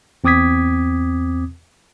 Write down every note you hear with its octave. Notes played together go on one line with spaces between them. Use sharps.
E2 C4 D6 D#6 G#6 B6